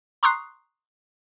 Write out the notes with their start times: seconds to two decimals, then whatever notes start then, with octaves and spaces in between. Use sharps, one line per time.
0.23 A#5 C6 C#6 D#6 F#6 C7